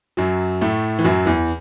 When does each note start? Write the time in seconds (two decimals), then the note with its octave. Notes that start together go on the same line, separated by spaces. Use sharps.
0.17 F#2 F#3
0.61 A2 A3
0.99 E3
1.04 F#2 F#3
1.25 E2 E3